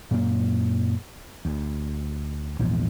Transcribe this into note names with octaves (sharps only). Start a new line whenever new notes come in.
F#2 A#2 A#3
D2
A#1 E2 G#2